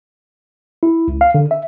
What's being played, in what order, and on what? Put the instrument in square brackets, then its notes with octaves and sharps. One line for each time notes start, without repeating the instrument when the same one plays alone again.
[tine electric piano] E4
C#2
F5
D3
E5